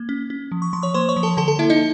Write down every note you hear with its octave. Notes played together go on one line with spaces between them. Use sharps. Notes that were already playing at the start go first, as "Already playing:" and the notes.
Already playing: A#3
C#4
C#4
F3
C#6
F3 C6
C#5 C#6
A#3 C5 C6
C#5 C#6
F3
A4 A5
D3 A4 A5
A4 A5
A#3 E4 E5
D#4 D#5